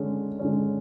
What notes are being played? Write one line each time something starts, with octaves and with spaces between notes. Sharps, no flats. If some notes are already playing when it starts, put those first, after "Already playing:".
Already playing: D3 G#3 C#4
D3 G#3 C#4